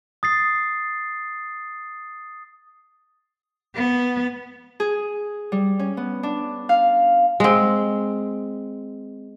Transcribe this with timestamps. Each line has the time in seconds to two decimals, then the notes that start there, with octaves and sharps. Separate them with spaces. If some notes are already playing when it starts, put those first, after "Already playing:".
0.23 D#6 A6 C7
3.76 B3
4.80 G#4
5.52 G3
5.79 C#4
5.97 B3
6.23 D4
6.69 F5
7.40 G#3 C4